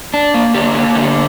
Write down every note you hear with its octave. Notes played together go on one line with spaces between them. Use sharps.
D4
A#3
D3 G4
A#3
D3